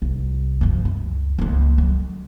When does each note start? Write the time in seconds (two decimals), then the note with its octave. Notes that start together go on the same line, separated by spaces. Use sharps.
0.02 C2
0.61 F#2 F3
0.85 C#2
1.39 C#2 A#3
1.78 D3 F#3